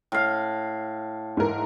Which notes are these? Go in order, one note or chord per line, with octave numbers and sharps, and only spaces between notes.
A2 F5
G#2 E3 A#4